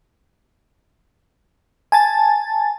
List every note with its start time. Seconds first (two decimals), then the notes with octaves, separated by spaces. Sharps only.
1.92 G#5 A5 A6